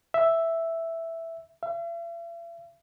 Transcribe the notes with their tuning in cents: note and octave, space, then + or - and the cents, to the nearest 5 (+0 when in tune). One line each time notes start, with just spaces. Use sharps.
E5 +0
E5 +45